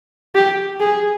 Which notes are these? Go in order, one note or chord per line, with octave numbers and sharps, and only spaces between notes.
G4
G#4